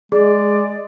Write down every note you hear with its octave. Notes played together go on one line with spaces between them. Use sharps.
G#3 G#4 D5